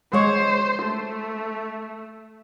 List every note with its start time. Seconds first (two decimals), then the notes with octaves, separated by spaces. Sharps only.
0.13 G#3 C5 C#5
0.83 A3